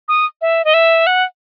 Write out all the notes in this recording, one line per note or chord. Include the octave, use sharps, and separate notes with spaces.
D#6
E5
D#5
E5
F#5